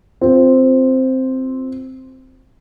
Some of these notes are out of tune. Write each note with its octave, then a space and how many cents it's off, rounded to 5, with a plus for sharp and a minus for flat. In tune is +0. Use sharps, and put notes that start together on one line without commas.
C4 +0 F4 +0